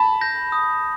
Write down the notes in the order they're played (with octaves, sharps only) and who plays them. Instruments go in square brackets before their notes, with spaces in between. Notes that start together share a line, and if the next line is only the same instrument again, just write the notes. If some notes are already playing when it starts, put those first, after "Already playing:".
Already playing: [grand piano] A5 B5
[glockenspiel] G6 A#6
D#6